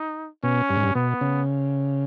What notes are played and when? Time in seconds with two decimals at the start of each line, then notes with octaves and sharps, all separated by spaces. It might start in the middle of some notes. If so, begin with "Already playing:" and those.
Already playing: D#4
0.43 B2 C#4
0.69 G2
0.77 G#2
0.83 G2
0.95 B2 B3
1.21 C#3